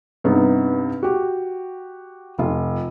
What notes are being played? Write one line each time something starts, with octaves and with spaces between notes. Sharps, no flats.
G2 C3 B3 D#4
F#4 G4
F1 F4